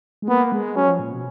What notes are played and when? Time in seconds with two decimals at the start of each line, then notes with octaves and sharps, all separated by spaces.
0.22 G#3
0.28 A#3 B3
0.52 G#3
0.76 F#3 C#4
0.88 F3
0.99 A#2
1.12 B2